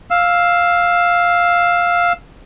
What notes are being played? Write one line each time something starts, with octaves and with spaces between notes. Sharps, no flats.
F5 E6